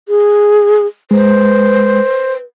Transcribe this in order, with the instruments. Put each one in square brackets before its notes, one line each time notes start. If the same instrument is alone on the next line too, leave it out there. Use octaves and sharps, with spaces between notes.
[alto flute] G#4
[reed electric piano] G#3 [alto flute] B4 [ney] C5